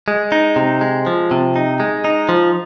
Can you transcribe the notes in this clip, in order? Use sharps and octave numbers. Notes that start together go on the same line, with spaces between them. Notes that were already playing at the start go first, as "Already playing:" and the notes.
G#3
D#4
C3
G#3
F3
C3
D#4
G#3
D#4
F3